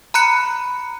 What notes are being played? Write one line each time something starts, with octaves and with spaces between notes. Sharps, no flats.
A#5 B5 F#6 C#7